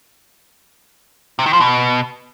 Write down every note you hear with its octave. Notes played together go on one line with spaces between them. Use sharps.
C3
D#3
F3
B2